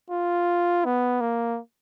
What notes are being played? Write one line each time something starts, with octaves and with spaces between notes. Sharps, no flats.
F4
B3
A#3